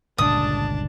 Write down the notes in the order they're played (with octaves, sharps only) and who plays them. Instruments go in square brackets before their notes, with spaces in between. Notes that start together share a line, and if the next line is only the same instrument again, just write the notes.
[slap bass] G1 C#2 [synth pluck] A#2 [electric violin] D4 A5 [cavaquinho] D#6